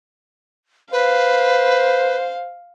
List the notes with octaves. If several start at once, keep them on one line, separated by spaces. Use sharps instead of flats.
B4 C5 F5